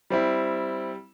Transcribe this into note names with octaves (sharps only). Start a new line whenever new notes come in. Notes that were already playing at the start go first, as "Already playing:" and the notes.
G3 C4 E4